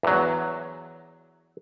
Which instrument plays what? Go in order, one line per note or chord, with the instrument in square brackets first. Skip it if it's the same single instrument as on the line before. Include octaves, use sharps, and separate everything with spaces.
[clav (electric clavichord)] E2 F#3